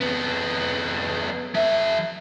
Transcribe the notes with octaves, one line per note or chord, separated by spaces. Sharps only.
F2 B3
F3 E5